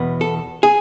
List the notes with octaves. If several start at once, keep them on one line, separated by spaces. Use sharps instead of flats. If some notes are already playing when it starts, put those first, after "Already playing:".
Already playing: E2 B2 B3
A4
G#4